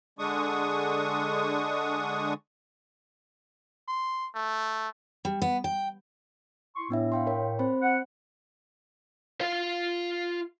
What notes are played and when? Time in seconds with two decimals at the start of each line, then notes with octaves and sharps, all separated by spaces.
0.19 D3 G#3 D4 C#6 D#6
3.88 C6
4.35 A3
5.25 G3
5.42 B3
5.64 G5
6.76 E4 C6 C#6
6.90 A2 B3 D4 E5
7.12 F5 G5 C6
7.27 A#4 C#5 G5
7.59 C4 C5 B5
7.82 F#5
9.41 F4 F5